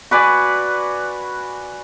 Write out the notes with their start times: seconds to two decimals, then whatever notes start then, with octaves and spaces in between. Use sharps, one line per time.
0.11 F#4 B4 D5 G#5